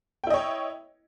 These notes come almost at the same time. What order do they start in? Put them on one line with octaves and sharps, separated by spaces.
G5 E4 D#5 C#5